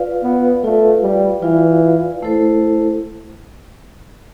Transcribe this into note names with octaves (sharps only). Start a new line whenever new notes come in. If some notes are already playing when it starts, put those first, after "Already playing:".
Already playing: F4 B4 D5 F5
B3
A3 F4 B4 D5 F5
G3
E3 F4 B4 D5 F5
A3 E4 A4 C5